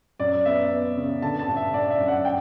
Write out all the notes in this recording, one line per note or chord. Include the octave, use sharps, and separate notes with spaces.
F#2 D5
B3 E5
B3
C#3
D3 A5
A5
G1
E5
G1 D5
E5
F#2
F#5
G5